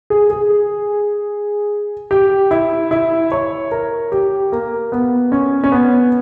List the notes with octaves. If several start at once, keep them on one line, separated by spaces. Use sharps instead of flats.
G#4
G#4
G4
E4
E4
C#5
A#4
G4
A#3
B3
C#4
C#4
B3